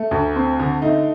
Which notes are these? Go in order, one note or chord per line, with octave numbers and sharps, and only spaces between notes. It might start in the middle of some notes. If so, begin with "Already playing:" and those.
Already playing: A3
D2
C4
D3
A3 D#4